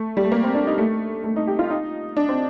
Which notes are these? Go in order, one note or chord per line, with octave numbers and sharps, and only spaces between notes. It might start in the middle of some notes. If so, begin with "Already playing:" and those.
Already playing: A3
G3
A3
A#3
C4
D4
D#4
A3
A3
D#4
G4
F4
D#4
D4
C4